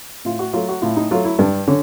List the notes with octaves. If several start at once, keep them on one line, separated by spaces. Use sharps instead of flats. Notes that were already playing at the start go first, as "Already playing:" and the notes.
A2 F4
F#4
F#3 A3 F4
F#4
A2 F4
D#4
F#3 A3 F4
E4
G2 D4
D3 C#4